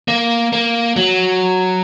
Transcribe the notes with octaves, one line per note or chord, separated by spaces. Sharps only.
A#3
A#3
F#3